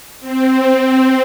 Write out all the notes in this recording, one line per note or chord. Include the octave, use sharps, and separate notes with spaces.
C4